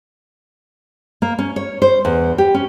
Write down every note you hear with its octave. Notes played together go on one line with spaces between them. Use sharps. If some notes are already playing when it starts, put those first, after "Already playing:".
A#3
C#4
C#5
C5
E2
G4
C#4